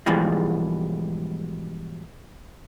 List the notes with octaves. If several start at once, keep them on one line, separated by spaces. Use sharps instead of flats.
G#2 B2 E3 F3 G3 G#3